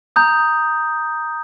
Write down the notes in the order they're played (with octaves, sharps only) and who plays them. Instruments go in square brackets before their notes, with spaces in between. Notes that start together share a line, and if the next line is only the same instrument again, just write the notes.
[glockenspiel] A#5 D#6 G6